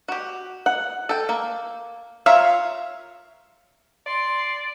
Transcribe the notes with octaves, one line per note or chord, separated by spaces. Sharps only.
F#4 G4
F#5
A4 G5
A#3
F4 A#4 C#5 E5 F5
D5 C6